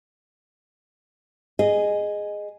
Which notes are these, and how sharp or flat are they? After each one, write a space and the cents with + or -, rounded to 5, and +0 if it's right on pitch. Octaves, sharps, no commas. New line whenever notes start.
G#4 +0 D#5 -10